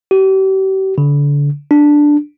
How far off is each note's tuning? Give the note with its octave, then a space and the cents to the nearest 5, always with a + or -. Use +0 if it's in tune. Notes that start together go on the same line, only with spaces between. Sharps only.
G4 -40
D3 -30
D4 +5